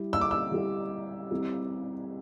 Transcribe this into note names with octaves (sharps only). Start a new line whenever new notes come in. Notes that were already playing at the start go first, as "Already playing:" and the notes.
Already playing: G3 E4 G4
E6
D6
E6
G3 E4 G4
G3 C4 E4 G4